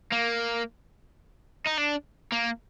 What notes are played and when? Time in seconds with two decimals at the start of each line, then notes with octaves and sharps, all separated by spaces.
0.12 A#3
1.66 D#4
1.77 D4
2.32 A#3